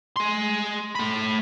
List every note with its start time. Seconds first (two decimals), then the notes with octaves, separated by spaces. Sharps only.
0.16 G#4 C6
0.95 A3 B5